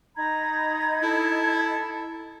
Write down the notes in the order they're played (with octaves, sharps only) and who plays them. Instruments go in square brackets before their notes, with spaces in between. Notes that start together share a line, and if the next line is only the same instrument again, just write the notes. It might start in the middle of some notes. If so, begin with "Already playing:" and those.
[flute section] D#4 B5 G#6 [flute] A#5
[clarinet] E4 [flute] A4